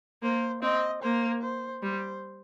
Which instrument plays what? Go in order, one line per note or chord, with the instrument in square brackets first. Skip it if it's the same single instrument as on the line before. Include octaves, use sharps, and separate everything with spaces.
[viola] A#3 [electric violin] C5
[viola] C4 [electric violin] D#5
[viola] A#3 [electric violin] C5
[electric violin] C5
[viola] G3 [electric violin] C5